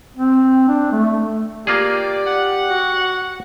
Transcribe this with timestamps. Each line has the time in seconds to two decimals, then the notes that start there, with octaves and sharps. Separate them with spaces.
0.17 C4
0.68 D4
0.92 A3
1.67 A#3 F4 G4 G#4 D5
2.27 F#5
2.70 F#4